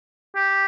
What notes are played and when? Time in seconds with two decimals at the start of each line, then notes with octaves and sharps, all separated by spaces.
0.36 G4